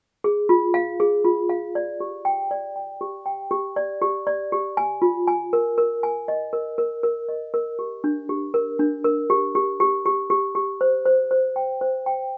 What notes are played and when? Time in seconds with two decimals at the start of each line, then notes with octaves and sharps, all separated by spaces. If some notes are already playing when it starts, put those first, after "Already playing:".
0.24 G#4
0.49 F4
0.74 F5
1.00 G#4
1.25 F4
1.49 F5
1.75 D5
2.00 G4
2.25 G5
2.51 D5
2.76 G5
3.01 G4
3.26 G5
3.51 G4
3.76 D5
4.02 G4
4.27 D5
4.52 G4
4.77 G#5
5.02 F4
5.27 G#5
5.53 A#4
5.78 A#4
6.03 G#5
6.28 D#5
6.53 A#4
6.78 A#4
7.03 A#4
7.29 D#5
7.54 A#4
7.79 G4
8.04 D4
8.29 G4
8.54 A#4
8.79 D4
9.04 A#4
9.30 G4
9.55 G4
9.80 G4
10.06 G4
10.30 G4
10.55 G4
10.81 C5
11.06 C5
11.31 C5
11.56 G5
11.81 C5
12.06 G5